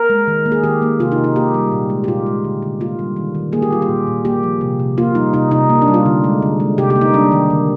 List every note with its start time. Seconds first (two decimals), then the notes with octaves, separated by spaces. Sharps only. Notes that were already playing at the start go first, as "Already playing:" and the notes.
Already playing: A#4
0.10 G#3
0.28 D#3
0.46 A#3
0.52 G#4
0.64 D#3 G4
0.82 A#3
1.00 C3 F4
1.12 D#4
1.18 C3
1.24 D#4
1.36 A#3 G4
1.54 G3
1.72 A#2
1.90 G#3
2.04 G4
2.08 A#2 F4
2.26 G#3
2.44 D3
2.62 D3
2.80 A#3 F4
2.99 G3
3.16 D#3
3.35 D#3
3.52 A#3 G#4
3.62 G4
3.71 G3 F4
3.82 G4
3.89 A#2
4.07 A#2
4.25 A#3 G4
4.43 F3
4.61 C3
4.79 C3
4.98 A#3 F4
5.15 G3 D#4
5.34 C3 D#4
5.51 C3 D#4
5.70 A#3
5.82 D4
5.88 G3
5.94 F4
6.06 D3
6.24 G#3
6.42 D3
6.60 G#3
6.78 C3 G4
6.90 G4
6.96 A#3
7.01 D#4
7.14 G3 D4
7.32 D#3
7.50 D3